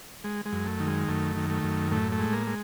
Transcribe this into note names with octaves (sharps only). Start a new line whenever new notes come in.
G#3
G#3
F#2
A3
D#3
G#3
F#2 A3
D#3
A3
F#2
A2 A3
A3
G#3
A#3
G#3